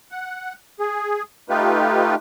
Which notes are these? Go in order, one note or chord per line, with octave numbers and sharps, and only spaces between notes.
F#5
G#4
A3 D#4 F4 G4 B4